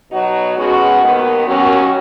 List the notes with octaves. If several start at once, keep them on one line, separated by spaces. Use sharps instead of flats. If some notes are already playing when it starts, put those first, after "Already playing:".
B2 F#3 D#4 F#4
B2 G#3 C#4 F#4
D#2 D#3 B3
D#2 D#3 F#3 C#4 F#4